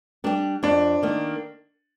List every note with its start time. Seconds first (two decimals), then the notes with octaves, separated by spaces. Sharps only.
0.24 G3 D4 G4
0.63 F2 D4
1.03 D#3 A#3